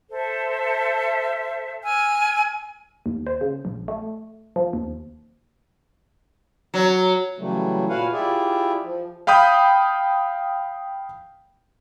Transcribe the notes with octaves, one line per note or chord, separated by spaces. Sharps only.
A4 C5 E5
G#5 E6 F6
D#2
C5
C#3
A#1
A3
F3
D#2
F#3
C#3 E3 F#3 G3 A3
A#2 F#4 B4 F5 F#5 G#5
E4 F4 G4 G#4 D5 E5
F3
F5 G5 B5 D#6 G6